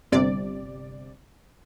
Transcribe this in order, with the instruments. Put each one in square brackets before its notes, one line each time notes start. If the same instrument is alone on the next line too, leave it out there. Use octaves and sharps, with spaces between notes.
[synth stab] G1 C3 D5